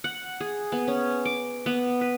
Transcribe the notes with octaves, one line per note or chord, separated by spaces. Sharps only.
F#5
G#4
B3
C#4
D6
B3
B4